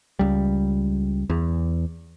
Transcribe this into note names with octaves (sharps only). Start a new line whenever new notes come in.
C#2 G3
E2